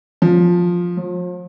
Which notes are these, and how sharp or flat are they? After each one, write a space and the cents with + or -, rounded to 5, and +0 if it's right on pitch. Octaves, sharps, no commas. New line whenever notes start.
F3 +10
F3 +40